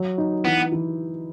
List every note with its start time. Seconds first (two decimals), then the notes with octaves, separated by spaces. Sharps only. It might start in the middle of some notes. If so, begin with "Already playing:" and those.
Already playing: F#3
0.18 D#4
0.45 E3 B3
0.72 E3